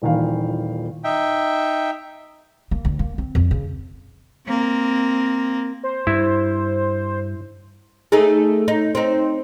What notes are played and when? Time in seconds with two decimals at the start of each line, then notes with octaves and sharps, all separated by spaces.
0.02 D#1 A#2 D#3 E3 F5
1.04 D#4 E5 G5
2.71 A#3
2.85 D2
2.99 A#3
3.18 C4
3.35 F2
3.51 C#3
4.47 A#3 C4
5.83 C5
6.07 G2 E4
8.12 A3 D#4 G#4
8.68 D#4
8.95 C4 D#4